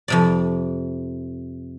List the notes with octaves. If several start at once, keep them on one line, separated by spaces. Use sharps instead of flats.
F2 C3 D5